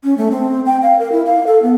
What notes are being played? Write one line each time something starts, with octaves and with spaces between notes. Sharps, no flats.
C#4
A3
C4
G5
F5
A#4
E4
F5
A4
B3